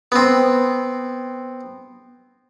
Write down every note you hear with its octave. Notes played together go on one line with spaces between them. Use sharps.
B3 C4